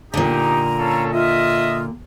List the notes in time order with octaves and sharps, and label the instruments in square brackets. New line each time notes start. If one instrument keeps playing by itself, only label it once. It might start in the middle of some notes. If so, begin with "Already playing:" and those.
[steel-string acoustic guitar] A#2 D3 [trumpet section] D#4 G4 [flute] A#5
[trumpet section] C#4 F4 A4
[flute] F4 [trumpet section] D#5 E5